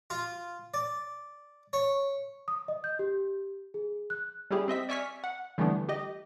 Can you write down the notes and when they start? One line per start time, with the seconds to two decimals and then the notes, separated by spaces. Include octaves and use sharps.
0.10 F4
0.74 D5
1.73 C#5
2.48 D#6
2.68 D#5
2.84 G6
2.99 G4
3.74 G#4
4.10 F#6
4.51 G3 C#4 E4 G4 G#4
4.68 C4 D#5 E5 B6
4.89 D5 E5 G#5 C#6 F6 B6
5.24 F#5
5.58 D3 E3 G3 A3 B3 D4
5.89 G4 D#5